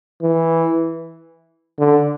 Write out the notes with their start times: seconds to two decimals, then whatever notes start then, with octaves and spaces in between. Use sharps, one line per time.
0.23 E3
1.79 D3